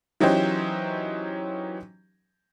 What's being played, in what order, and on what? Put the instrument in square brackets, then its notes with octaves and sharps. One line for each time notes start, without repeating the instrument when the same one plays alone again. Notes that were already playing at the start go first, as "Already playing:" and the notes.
[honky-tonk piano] E3 F#3 C#4 D#4 G4 C5